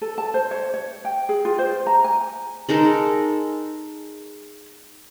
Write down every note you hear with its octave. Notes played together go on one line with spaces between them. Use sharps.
A4
A5
C5
C#5
C#5
G5
G#4
F4
C5
A#5
G#5
G#3 D#4 A4 A#4